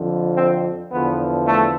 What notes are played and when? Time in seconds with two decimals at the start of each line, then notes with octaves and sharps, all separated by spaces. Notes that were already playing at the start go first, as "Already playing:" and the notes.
Already playing: F2 D3 F3
0.36 C4
0.91 E2 D3 F3 B3
1.47 A3